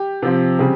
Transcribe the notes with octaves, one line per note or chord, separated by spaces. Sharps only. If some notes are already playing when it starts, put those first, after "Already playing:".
Already playing: G4
C3 F3 C4
C#3 G3 C4